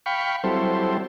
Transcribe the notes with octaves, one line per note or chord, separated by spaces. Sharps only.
F5 G5 B5 C#6
F#3 G3 C4 E4 A4 C5